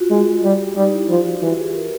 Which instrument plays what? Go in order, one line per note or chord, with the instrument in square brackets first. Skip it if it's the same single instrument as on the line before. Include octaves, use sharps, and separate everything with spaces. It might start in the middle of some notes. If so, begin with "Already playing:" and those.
Already playing: [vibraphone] F4 F#4
[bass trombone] G#3
[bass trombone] G3 [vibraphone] G4
[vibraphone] G4
[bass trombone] G3 [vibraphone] D#4
[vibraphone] E4
[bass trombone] F3 [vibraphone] F4
[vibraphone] F#4
[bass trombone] E3 [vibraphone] G4
[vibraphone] G#4
A#4